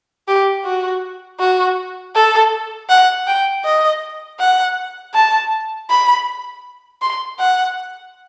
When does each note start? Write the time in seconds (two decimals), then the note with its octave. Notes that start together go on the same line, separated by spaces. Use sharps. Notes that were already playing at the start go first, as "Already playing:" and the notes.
0.28 G4
0.65 F#4
1.40 F#4
2.15 A4
2.90 F#5
3.27 G5
3.65 D#5
4.39 F#5
5.14 A5
5.90 B5
7.02 C6
7.39 F#5